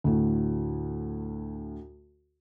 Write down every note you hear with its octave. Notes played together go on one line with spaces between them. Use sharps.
D2 A2